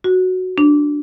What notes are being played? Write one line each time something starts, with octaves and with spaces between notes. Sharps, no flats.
F#4
D4